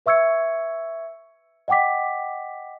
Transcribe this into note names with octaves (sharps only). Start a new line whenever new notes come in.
B4 E5 C#6 E6 G#6 C#7
D#5 F#5 G5 D6 B6